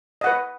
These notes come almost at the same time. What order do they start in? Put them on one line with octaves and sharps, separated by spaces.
D#5 F#5 B4